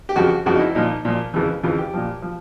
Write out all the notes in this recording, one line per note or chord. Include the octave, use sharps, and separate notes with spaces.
G4
F2 C#3 F3 F#4
F2 C#3 F3 F#4
D#4
E4
A#2 F3 D#4
A#2 F3
F2 C#3 E3
F2 C#3 E3 F4
G4
A#2 F3
F3